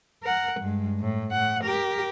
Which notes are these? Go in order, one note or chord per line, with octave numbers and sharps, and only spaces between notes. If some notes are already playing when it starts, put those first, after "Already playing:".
A#4 F#5
G2 G#3
A2
A2 F#5
G4 A#4